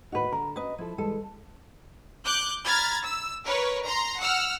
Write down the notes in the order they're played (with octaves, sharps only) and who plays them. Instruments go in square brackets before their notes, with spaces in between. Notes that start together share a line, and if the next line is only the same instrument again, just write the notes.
[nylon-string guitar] D#2 A2 D#4 [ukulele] F#4 B4
[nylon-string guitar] D3 [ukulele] A#4
[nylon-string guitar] C#4 F#4 [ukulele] B4 D#5
[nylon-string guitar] F3 A4 [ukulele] E4
[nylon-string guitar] E3 G3 G#3 [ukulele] A4
[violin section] D6 F#6 G6
A#5 B5 F6 G#6 A6
E6
A#4 B4 C#5
A#5 C6
F#5 E6 F6